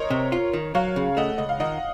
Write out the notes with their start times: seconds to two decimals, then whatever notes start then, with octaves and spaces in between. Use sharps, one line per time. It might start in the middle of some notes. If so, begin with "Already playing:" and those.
Already playing: A#4 C5 C#5 D#5
0.10 C3
0.32 F4
0.53 D#3
0.75 F#3 C#5 F5
0.96 C#3
1.17 A3 D#5 F#5
1.38 C#2 D#5
1.49 F5
1.60 D#3 D#5 F#5